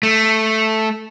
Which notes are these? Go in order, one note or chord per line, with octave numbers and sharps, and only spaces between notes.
A3